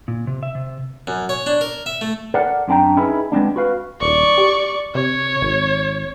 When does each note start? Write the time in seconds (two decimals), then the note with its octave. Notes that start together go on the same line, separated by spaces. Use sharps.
0.08 A#2
0.27 C3
0.43 E5
0.55 C3
1.07 F#2
1.29 C#5
1.46 D4
1.61 A#4
1.86 E5
2.01 A3
2.34 A4 A#4 D5 F#5
2.68 F#2 C4 D4 G5 A#5
2.97 C#4 D#4 E4 G#4 B4
3.32 G#3 B3 C4 D4
3.56 F#4 B4 F5
4.01 D#1 D5 C#6
4.38 G4
4.95 C3 C#5
5.41 G#1